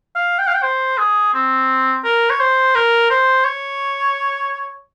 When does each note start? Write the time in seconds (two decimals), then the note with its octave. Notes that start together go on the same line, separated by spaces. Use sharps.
0.15 F5
0.39 G5
0.47 F5
0.54 G5
0.63 C5
0.98 G#4
1.34 C4
2.05 A#4
2.30 C#5
2.40 C5
2.75 A#4
3.10 C5
3.45 C#5